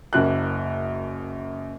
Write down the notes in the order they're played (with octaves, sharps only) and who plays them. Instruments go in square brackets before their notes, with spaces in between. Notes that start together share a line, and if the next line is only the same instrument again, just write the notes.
[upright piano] F#1 F#2 F#6